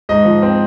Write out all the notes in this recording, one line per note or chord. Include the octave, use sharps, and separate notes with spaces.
G#2 D#5
F3
C4